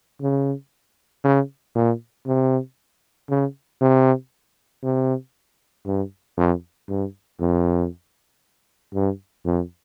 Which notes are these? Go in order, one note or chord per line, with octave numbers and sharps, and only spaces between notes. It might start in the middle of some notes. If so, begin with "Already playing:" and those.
C#3
C#3
A#2
C3
C#3
C3
C3
G2
F2
G2
F2
G2
F2